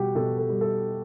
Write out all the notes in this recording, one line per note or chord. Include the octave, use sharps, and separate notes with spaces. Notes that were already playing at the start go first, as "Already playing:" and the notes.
Already playing: B2 G3 F#4 G4
B2 A4
A4
G3
A4